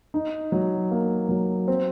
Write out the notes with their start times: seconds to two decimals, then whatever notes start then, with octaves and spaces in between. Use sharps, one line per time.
0.14 D#4
0.52 F#3
0.91 A#3
1.29 F#3
1.68 C4